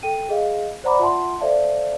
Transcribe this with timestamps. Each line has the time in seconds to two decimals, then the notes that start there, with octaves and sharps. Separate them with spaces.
0.03 A4 G5 D#7
0.29 G#4 D#5 F5
0.84 C5 D5 F#5 A#5 B5 D6
0.99 F4 E5 F#5 A5 C6
1.40 A4 C5 D5 E5 F5 A5